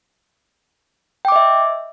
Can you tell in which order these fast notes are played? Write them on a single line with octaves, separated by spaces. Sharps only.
G5 D6 D#5 E5